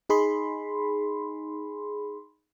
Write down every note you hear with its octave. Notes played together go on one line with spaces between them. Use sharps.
D#4 G#4 B5 C6